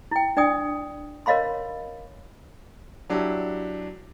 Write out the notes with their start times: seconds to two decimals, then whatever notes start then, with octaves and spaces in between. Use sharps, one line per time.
0.11 E4 G5
0.37 D4 D5 G5 D#6
1.26 A#4 C#5 D#5 F5 B5 C6
3.10 F#3 D4 E4 G4